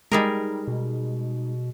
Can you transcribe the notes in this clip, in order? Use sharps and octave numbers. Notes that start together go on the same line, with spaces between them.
G3 G#3 D#4 G#4 A#4
B2